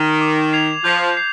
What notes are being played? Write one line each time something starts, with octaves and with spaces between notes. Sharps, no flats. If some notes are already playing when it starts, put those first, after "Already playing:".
Already playing: D#3
D6
G#6 C7 F7
F3 G6
C7